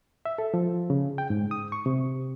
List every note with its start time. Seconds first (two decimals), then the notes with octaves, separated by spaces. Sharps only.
0.25 E5
0.38 A4
0.54 F3
0.90 C#3
1.18 G5
1.30 G#2
1.51 D#6
1.72 C#6
1.86 C3